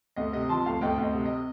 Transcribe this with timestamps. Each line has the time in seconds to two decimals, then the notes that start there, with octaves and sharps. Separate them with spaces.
0.16 D2 D#5
0.33 C3 D#5
0.49 F3 A5 C6
0.65 D2 F5 A5
0.81 D2 D#5 G5
0.98 D2
1.03 D#5
1.14 C3
1.26 D#5